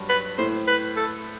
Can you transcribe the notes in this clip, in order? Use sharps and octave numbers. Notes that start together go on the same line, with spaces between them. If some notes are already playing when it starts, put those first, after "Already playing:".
Already playing: G2 F#3 G3
B4
A2 C5
B4
A4